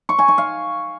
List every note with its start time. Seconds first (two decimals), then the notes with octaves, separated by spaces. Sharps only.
0.09 C#6
0.19 G#5
0.28 C#6
0.38 F5